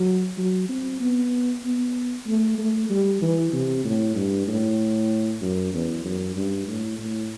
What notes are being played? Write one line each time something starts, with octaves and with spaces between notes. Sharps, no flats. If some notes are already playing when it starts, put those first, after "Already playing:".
Already playing: F#3
F#3
C4
B3
B3
A3
A3
G3
E3
C3
A2
G2
A2
F#2
E2
F#2
G2
A2
A2